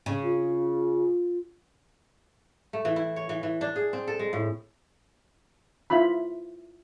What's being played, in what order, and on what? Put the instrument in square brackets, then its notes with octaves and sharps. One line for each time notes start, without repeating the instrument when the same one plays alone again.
[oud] C#3
[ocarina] F4
[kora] A3
E3
E4
C#5
E3
E3
D4
G#4
C4
A4
G#3
A2
[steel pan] E4 F4 B5